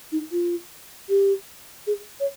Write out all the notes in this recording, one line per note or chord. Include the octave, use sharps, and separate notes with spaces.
D#4
F4
G4
G#4
C#5